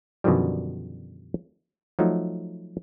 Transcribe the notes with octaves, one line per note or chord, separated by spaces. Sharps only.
F#2 B2 D3 D#3 F3 G3
F3 F#3 A3 D#4